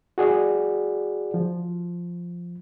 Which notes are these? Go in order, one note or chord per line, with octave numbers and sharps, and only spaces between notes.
F#4 G#4 D5
F3